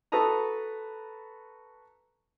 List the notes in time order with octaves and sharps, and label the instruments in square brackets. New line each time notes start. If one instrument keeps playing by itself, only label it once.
[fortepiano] F#4 A4 B4 A5 A#5 D#6